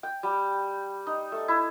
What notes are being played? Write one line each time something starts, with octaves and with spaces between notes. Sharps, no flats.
G5
G3
D#4
A3
E4